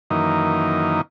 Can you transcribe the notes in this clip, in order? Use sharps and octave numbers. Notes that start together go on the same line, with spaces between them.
F#2 D#3 E3 A#3 D#4